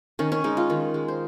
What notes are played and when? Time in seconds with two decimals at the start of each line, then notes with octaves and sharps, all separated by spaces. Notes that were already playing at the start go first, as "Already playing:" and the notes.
0.19 D#3 C#4
0.32 C#4
0.44 G#3 D#4
0.57 F4
0.70 D#3
0.94 G#3
1.08 C5